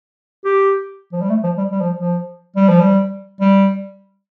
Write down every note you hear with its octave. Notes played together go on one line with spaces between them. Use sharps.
G4
F3
G3
A3
F3
G3
G3
F3
F3
G3
F3
G3
G3